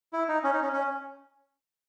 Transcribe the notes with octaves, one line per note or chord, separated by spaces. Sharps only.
E4
D#4
C#4
D#4
C#4
C#4